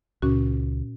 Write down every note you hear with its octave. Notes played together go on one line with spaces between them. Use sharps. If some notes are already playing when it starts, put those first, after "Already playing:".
C#2 A#2 C#4 F#4